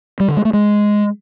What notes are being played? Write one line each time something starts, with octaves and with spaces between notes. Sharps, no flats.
G3
D3
G#3
A3
G#3